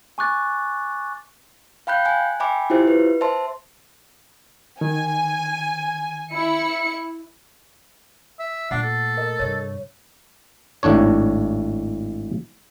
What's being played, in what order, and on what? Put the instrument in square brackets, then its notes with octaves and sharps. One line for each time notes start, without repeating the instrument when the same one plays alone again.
[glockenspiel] G#5 C#6 D6 F#6 A6
[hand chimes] F5 G5 B5 F#6 G6
G#5 F#6
E5 G5 G#5 B5 D6
E4 F4 G4 C5 E5
B4
C5 E5 A5 C6
[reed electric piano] D#3 [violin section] G#5
[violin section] E4 C#7
[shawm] E5
[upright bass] A#2 A3 [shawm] D4 [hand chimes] F#5 C7
[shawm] A4
[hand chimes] A#4 D#5
[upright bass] G2 C3 [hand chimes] C#5
[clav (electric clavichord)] G#1 A2 D4 C#5